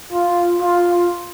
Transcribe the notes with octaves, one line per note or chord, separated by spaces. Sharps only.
F4
F4